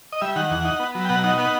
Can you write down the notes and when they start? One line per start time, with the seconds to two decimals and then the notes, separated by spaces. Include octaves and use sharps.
0.12 D#5
0.21 G3 E5
0.36 D#3 F#5
0.50 E2
0.65 D#4
0.80 B3
0.95 F#3
1.05 G5
1.09 B2 F#5
1.23 D#4 F#5
1.38 B3 F#5